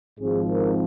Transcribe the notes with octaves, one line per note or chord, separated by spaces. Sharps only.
G#1 G#2 F3 C4 G#4
A#4